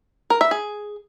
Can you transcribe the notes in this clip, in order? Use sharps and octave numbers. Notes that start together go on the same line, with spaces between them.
A#4
E5
G#4